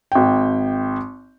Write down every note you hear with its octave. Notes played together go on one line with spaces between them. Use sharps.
G#1 G5